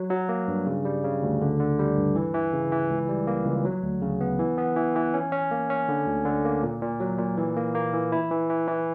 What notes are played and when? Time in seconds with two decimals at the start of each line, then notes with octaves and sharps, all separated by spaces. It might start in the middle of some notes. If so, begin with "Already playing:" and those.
Already playing: F#3
0.10 F#3
0.29 A#3
0.48 G2
0.67 C#3
0.85 G3
1.04 C#3
1.23 D2
1.41 D3
1.59 D3
1.79 G3
1.97 G2
2.15 E3
2.34 E3
2.53 C#3
2.72 E3
2.90 C#2
3.09 G3
3.27 A#3
3.46 C#2
3.65 F#3
3.83 D2
4.02 C#3
4.21 B3
4.39 E3
4.58 B3
4.76 E3
4.96 E3
5.14 C#4
5.32 C#4
5.51 A#3
5.70 C#4
5.89 D3
6.07 D2
6.25 D3
6.45 A#3
6.63 A#2
6.82 A#2
7.00 F#3
7.19 A#2
7.38 E3
7.56 A#3
7.75 A#3
7.93 E3
8.12 E4
8.31 E3
8.50 E3
8.68 E3